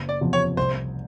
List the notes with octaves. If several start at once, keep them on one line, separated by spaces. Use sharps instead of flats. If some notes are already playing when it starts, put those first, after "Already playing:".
Already playing: F#1
D5
E2 C3 F3
C#5
C2 C5